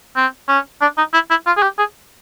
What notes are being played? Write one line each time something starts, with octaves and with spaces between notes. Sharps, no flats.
C4
C#4
D4
D#4
E4
E4
F4
G#4
G4
G#4